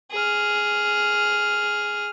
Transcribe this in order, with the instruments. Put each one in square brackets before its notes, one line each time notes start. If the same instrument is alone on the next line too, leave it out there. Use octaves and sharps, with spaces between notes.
[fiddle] G#4 F6